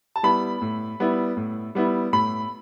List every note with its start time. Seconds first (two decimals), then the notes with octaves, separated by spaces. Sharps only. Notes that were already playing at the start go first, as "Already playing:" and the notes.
0.16 A5
0.23 G3 B3 E4 B5
0.62 A2
1.00 G3 B3 E4
1.37 A2
1.75 G3 B3 E4
2.13 A2 B5